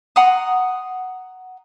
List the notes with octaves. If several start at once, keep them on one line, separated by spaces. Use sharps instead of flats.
F#5 A#5 C6 D#6